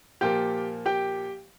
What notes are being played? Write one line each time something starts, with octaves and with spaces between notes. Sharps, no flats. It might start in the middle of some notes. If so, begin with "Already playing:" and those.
A#2 F3 A#3 G4 G5
G4 G5